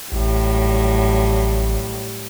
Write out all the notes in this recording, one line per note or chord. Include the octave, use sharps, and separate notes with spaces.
A1 A2 F#3 G3